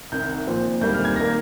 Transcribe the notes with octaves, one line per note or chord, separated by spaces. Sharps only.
C2 C3 D#3 G6
A#2 F3 C4
D2 C3 D#3 G3 A#3 G6
F6
G#6
A#6
D#3 A#3